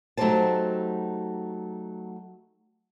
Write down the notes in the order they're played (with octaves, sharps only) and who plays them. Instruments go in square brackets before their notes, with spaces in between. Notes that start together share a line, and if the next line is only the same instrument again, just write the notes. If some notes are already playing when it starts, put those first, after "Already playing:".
[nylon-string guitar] F#3 A3 D#4 G4 C5 A5